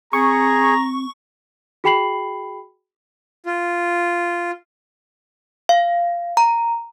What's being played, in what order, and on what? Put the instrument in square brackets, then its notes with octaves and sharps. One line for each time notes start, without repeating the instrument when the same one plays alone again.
[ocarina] C4 [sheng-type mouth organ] G#4 [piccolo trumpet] A#5 [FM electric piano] C#6
[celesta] F#4 G#4 G5 B5 C7 F#7
[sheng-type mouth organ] F4
[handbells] F5
A#5